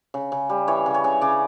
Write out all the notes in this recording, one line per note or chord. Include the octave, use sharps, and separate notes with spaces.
C#3
C#3
G3
E3 C#5
C#3
C#5
C#3
C#3 D5